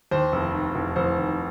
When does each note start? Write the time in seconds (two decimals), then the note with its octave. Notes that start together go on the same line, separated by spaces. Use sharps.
0.11 D#2 C5
0.33 F1
0.54 D#3
0.75 F1
0.96 F1 C5
1.17 D#3